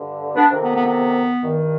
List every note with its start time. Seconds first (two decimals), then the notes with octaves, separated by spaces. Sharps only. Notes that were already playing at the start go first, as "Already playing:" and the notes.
Already playing: G2 D3
0.35 B3 D4
0.51 F2 C3 D#3
0.63 B3
0.74 B3
0.85 B3
1.43 G2 D#3